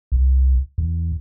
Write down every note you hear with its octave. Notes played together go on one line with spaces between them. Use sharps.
C2
E2